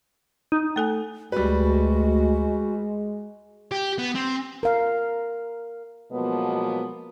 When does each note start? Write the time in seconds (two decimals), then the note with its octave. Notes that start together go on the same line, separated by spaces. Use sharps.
0.52 D#4
0.76 A3 A4 G#5
1.32 D2 G3 G#3 F#4 B4
3.72 G4
3.99 B3
4.15 C4
4.63 A#4 F5
6.12 B2 F3 F#3 G#3 A#3 B3